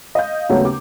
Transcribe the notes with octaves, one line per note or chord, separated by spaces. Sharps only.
D#5 F5 G6
D#2 C#3 F#3 A3 B3
D6